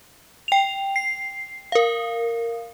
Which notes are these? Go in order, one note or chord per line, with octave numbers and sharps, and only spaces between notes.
G5 F7
C7
A#4 F5